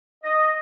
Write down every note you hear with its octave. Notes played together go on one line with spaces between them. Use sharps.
D#5